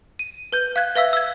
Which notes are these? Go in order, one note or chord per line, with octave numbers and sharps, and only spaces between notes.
D#7
B4 G6
F5 F#6 G#6
B4 E5 F5 E6
E6 G#6